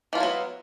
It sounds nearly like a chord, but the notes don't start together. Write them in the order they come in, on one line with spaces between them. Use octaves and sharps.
E3 F4 E4 F#3 B3